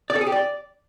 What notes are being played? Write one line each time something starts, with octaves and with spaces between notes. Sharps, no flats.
D5
A4
G#4
G4
D5